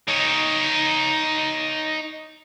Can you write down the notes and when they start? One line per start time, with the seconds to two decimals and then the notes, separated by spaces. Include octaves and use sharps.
0.08 D#4 C#5